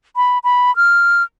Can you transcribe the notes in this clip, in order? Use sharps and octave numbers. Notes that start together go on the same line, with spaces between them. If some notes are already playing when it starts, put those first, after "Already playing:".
B5
B5
F6